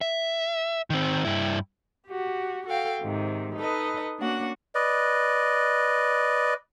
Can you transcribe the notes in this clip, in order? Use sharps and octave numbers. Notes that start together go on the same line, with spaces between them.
E5
D#3 C4
G2 E4
F#4 G4
F#4 A4 F5 G5
G#2 C3 D#3
D#4 A4 B4 D#5
A#3 C#4 D4 F#4 F#5
B4 D5 D#5